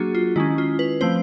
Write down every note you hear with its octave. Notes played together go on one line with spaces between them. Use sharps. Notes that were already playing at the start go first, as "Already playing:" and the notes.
Already playing: F#3 A#3 D4 F#4 G#4
F4
D#3 G#3 C#4 E4
F4
B4
F3 A3 C4 C5